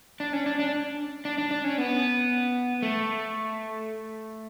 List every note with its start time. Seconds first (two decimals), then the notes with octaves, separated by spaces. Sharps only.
0.20 D4
0.33 C#4
0.46 D4
0.59 D4
1.25 D4
1.38 D4
1.51 D4
1.64 C#4
1.78 B3
2.82 A3